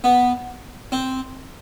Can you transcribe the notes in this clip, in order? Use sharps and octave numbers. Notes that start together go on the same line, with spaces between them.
B3
C4